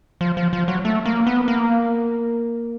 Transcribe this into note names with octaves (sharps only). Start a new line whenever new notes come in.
F3
F3
F3
F#3
A3
A#3
B3
A#3